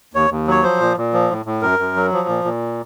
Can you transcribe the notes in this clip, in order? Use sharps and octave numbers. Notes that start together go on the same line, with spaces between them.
D#2 C#5
D#2
F#3 C#5
F3 C5
A#2
A#2
F3
A2
A2
F#2 A#4
F#2
F#3
F3
A#2
A#2